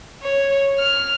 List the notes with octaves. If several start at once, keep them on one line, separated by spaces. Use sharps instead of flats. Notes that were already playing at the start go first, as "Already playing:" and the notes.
C#5
F6